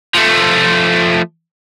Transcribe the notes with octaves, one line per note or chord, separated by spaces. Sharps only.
F3 A3